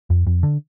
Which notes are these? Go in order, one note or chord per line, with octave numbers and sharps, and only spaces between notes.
F2
F2
D3